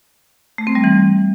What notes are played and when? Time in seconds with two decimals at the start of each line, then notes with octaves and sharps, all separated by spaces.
0.58 A3
0.67 C4
0.75 G3
0.84 E3